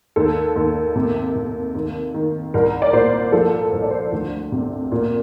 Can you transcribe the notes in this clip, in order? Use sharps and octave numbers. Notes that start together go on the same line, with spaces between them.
D#2 A4
D#2
C3
C3
D#2
D#3
C2 A#4
D5
A#2 C5
F3 A4
C2 C5
D5
C5
D2
C3
A#2